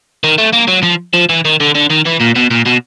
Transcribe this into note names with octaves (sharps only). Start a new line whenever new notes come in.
D#3
A3
A#3
F#3
F3
F3
E3
D#3
D3
D3
D#3
E3
A#2
B2
A#2
B2